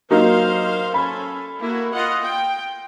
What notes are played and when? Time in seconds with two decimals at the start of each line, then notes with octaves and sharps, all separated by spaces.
0.11 F#3 A#3 D#4 C5 F5
0.94 C#4 A4 B5
1.60 A#3 E4 F#4
1.94 F4 D#5 F#5
2.23 G5